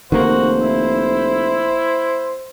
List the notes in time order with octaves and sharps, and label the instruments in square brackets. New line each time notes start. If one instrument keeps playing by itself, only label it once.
[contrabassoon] F1 [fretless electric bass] D#3 A#3 [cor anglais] F#4 [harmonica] C5
[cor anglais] E4